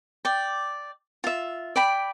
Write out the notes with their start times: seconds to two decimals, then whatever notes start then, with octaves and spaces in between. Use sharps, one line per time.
0.25 D5 G5
1.24 F4 E5
1.76 D5 G5 B5